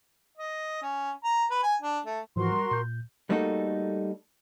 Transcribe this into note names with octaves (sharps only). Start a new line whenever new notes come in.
D#5
C#4
A#5
B4
G#5
D4
A3
G#2 E3 F3 F#4 A#4 C6
G3
A#2 G6
G3 A3 A#3 D#4 F#4 A4